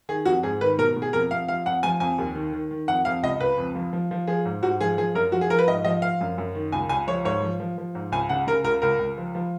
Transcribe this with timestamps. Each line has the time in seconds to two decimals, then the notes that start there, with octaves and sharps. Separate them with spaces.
0.09 D#3 G#4
0.25 F2 F#4
0.43 G#2 G#4
0.61 D#3 B4
0.78 B2 A#4
0.96 B2
1.02 G#4
1.13 F2 A#4
1.31 F2 F5
1.48 F3 F5
1.66 F2 F#5
1.83 F3 G#5
2.00 F2 G#5
2.18 D#2
2.35 D#3
2.53 D#3
2.71 D#3
2.88 F2 F#5
3.05 F2 F5
3.23 C#2 D#5
3.40 C#2 B4
3.58 F2
3.75 F3
3.93 F3
4.11 F3
4.27 F3 G#4
4.45 G#2
4.62 G#2 F#4
4.81 F3 G#4
4.98 F3 G#4
5.15 F#2 A#4
5.32 F3 F#4
5.41 G#4
5.50 F3 A#4
5.59 B4
5.68 G#2 D#5
5.85 F3 D#5
6.02 F3 F5
6.21 F#2
6.38 F#2
6.55 D#3
6.72 C#2 G#5
6.89 C#2 G#5
7.07 F3 C#5
7.25 G#2 C#5
7.42 F3
7.60 F3
7.78 F3
7.95 G#2
8.12 C#2 G#5
8.29 C#3 F#5
8.47 C#3 A#4
8.64 C#2 A#4
8.82 C#2 A#4
8.99 C#2
9.18 F3
9.35 F3